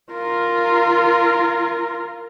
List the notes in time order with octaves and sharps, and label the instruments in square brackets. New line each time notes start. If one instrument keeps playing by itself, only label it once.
[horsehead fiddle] F4 A#4